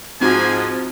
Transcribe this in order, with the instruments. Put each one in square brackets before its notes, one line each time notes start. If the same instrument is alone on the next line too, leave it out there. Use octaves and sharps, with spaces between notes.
[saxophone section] G#2 [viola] F3 [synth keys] C4 D#4 F#4 [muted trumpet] G#5